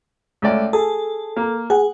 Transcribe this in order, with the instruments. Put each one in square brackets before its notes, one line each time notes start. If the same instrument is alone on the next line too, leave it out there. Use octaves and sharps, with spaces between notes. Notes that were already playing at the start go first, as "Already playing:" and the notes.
[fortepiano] C#2 A3 D5
[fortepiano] G#4 [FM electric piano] A4
[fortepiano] A#3
[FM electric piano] G#4 [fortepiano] F#5